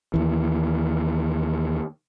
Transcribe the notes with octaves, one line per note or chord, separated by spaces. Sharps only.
D#2 E3